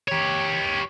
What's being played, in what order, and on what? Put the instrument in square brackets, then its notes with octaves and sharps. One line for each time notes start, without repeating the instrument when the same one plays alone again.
[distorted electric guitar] G4 C#5